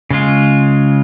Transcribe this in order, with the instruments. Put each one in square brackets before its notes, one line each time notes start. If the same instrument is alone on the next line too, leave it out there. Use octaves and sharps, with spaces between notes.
[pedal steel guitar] C#3 G#3 F4